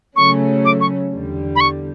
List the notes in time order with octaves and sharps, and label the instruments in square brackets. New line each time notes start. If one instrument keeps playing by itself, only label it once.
[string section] C#3 F#3 A3 C#4 [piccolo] C#6
[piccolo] D6
C#6
[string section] E2 D3 G3
[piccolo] B5
C#6